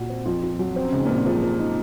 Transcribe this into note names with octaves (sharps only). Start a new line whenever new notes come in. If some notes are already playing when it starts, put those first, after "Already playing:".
Already playing: A#2 F#4
C4
F2 F4
F4
F#3
C4
F#2
G#2 C#3
A#2 C4
C3
C#3 F3
F3
D#4